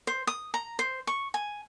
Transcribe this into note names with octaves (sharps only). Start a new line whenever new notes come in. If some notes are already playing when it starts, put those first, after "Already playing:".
C5
D#6
A#5
C5
C#6
G#5